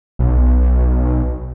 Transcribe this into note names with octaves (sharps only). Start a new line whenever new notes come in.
B1